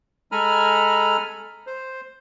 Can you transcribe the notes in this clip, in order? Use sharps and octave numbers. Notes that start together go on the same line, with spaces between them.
G#3 A4 G#5 A#5 B5 F6
C5